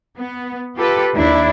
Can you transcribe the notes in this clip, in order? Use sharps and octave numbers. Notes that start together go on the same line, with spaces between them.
B3
F4 G4 A4 B4
D#2 D4 E4